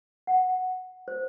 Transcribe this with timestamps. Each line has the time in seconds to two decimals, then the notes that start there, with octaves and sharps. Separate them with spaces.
0.27 F#5
1.08 C5